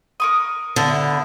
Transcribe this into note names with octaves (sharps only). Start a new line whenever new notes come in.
A#4 C#6 D#6
D3 B3 E4